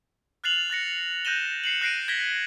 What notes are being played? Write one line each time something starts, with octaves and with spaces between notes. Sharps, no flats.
F6 F#6 A6 C7 F7 F#7
F#6 A6 A#6 C#7
F#6 G6 A#6 D#7 E7 G7
C7 C#7 F#7
F#6 A#6 C7 D7 D#7
G#6 A#6 B6 G7